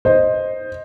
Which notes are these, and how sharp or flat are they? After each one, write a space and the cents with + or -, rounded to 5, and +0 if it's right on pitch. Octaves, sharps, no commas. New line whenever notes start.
C5 +10 D#5 +0